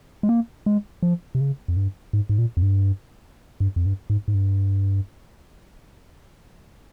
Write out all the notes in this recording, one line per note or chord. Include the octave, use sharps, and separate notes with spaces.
G#3
A#3
G#3
F3
C3
C#3
F2
G2
G#2
G#2
A#2
F2
G2
G2
F2
G2
G#2
G#2
G2